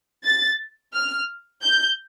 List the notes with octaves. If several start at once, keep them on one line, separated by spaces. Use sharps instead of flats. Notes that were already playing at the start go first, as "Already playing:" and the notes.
A6
F6
G6